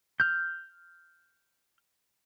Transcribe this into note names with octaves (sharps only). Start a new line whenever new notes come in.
F6 G6